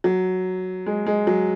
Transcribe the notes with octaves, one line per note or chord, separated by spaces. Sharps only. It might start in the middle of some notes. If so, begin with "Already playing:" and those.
F#3
G#3
G#3
F#3